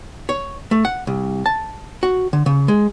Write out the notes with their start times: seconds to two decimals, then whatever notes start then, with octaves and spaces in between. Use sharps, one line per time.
0.29 C#5
0.71 A3
0.85 F#5
1.07 C2
1.46 A5
2.03 F#4
2.33 D3
2.46 C#3
2.68 G#3